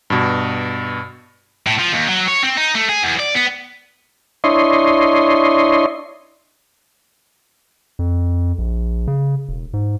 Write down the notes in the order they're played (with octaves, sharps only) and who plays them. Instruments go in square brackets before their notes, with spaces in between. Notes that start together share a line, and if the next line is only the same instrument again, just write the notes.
[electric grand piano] G2 B2
[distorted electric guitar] A2
F3
D#2
F#3
C#5
C4
D#4
A3
G#4
E2
D5
B3
[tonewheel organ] D4 E4 C#5 D#5 C6
[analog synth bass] F2
A#1
C#3
E1
G#2